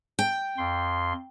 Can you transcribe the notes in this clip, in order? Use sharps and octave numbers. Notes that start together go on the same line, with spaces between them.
G5
F2 C6